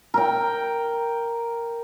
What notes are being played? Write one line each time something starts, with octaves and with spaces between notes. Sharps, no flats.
A#4 G5